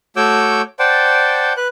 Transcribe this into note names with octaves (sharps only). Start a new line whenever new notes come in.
A3 F#4 C#5 D6 E6 G6
C5 D5 F#5 G5 A5
B4 F#6